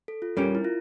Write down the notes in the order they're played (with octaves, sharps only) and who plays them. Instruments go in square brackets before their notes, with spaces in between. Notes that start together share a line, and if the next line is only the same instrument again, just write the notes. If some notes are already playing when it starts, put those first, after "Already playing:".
[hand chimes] A4
F4
[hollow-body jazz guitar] G3 C#4 G4 [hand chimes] A#4
[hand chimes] E4
F4